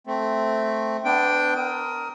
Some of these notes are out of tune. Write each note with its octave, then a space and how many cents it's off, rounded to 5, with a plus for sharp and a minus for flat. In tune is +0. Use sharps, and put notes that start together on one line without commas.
A3 +0 C4 +0
B3 +30 D4 +0 G5 +0
A#4 +0 D#6 +25